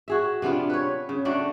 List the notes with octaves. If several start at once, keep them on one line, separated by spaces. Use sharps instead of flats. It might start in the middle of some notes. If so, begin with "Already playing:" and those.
F#4 G#4 E5
C3 B3 D4 F4
B4 C#5
C#3
A3 D4 F#4